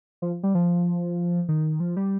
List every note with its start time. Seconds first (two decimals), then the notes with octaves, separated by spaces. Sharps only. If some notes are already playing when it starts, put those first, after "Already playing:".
0.22 F3
0.43 G3
0.55 F3
1.49 D#3
1.80 F3
1.96 G3